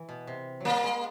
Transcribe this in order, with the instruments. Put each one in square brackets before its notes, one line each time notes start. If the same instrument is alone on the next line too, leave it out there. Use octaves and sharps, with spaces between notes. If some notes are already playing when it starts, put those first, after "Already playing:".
Already playing: [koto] E3
B2
C3
[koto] F#3 G3 [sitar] A#3
[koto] G#3